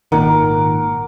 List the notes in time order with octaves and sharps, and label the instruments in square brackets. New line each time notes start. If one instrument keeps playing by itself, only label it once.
[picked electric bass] G#1 A#2 D#3 [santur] A#4 F#5 D6